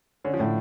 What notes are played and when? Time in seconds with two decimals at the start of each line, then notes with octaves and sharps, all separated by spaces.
0.24 D3 C#4
0.34 F3
0.39 A2 D3